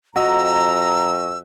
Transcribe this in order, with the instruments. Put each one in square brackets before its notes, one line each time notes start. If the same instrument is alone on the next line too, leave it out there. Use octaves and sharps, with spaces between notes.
[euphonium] F2 [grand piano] F#4 D#5 [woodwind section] A#5 [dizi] E6